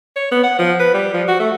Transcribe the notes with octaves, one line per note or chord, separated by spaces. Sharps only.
C#5
B3
F#5
F3
B4
G3
F3
F#4
A3